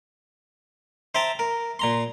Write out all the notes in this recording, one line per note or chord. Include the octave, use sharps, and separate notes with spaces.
C5 E5 G5 A5 A#5
A#4
A#2 A#5 C6